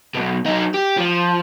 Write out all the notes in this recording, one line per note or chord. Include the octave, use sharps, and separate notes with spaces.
B1 B2
F#3 D#4
G4
F3